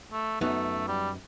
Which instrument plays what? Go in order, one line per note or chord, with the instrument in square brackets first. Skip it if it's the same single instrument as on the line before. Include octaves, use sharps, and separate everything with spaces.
[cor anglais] A3
[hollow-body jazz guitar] F#2 B3 D#4 [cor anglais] A3
[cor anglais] G3